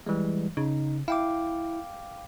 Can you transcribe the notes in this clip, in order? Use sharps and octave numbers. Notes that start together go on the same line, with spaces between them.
E3 G3 G#3
C#3 D#4
E4 F5 G5 D6